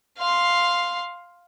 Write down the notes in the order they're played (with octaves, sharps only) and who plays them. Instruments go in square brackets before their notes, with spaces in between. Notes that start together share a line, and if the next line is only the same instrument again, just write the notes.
[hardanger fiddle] F5 C6